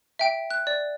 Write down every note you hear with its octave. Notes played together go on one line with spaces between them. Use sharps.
E5 G5 D7
F#6
D5